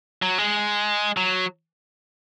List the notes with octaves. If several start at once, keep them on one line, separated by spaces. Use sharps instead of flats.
F#3
G#3
F#3